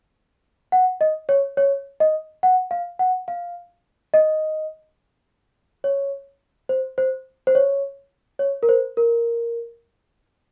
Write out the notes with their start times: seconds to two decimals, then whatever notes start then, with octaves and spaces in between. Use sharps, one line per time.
0.72 F#5
1.01 D#5
1.29 C#5
1.57 C#5
2.00 D#5
2.43 F#5
2.71 F5
2.99 F#5
3.28 F5
4.14 D#5
5.84 C#5
6.69 C5
6.98 C5
7.47 C5
7.55 C#5
8.39 C#5
8.63 A#4
8.69 C5
8.97 A#4